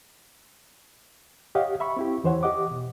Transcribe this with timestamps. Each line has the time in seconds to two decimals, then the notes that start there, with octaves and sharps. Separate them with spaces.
1.55 G4 C#5 D#5 F5 F#5
1.80 E5 B5 C#6
1.97 C4 E4 G4
2.24 E2 E3 C5 C#5 F#5
2.43 G4 D#5 F#5 D6
2.71 B2